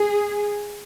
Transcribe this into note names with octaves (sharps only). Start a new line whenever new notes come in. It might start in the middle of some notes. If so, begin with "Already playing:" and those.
Already playing: G#4